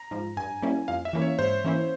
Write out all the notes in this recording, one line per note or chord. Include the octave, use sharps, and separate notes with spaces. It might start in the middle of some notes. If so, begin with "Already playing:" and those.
Already playing: A#5
G#2 F3
G2 G#5
G3 A#3 C#4 E4
F2 F5
E5
E3 A#3 C#4 E4
C#5
G#2 C5
E3 A#3 C#4 E4